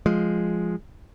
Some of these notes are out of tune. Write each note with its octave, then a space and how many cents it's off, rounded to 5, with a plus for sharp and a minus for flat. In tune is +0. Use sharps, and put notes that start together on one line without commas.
F3 +0 G#3 +0